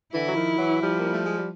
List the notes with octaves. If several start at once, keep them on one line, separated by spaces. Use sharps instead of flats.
D3 E3 E4
F#3
D#3 F3
E3 F#3
F3 G3
A#3
A3
G#3
G3